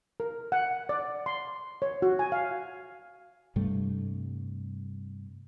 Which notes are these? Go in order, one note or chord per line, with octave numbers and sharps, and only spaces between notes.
A#4
F#5
D5
C6
C#5
F#4
G#5
F5
G2 C3 G3 A3